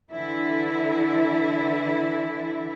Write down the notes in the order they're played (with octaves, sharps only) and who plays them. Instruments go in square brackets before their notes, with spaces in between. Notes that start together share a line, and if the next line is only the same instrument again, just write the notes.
[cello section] D3 E3 E4